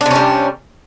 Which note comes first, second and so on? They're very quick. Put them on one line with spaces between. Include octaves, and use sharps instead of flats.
D4 C3 C#4 G3